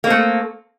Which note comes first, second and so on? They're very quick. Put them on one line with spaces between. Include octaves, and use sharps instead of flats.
A#3 C4 A3